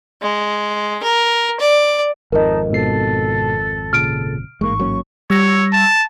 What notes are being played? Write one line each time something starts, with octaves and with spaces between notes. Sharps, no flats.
G#3
A#4
D5
G#1 F2 D#4 A#4 D#5 A5
G#2 B2 A4 C7
A#2 C#3 F6 D7
A1 G#2 G#3 A#3 C#6
F#3 A#3 C#4
G3 C#5 E6 A#6
A5